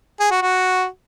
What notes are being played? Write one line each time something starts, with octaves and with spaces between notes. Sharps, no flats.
G#4
F#4
F#4